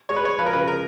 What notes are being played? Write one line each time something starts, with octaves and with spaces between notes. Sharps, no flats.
G#3 C#5
B4
G#3 C#5
F3 B4
A#4
C#3 B4
G#3 A#4